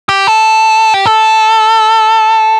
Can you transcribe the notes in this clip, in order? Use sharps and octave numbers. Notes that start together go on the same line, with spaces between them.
G4
A4
G4
A4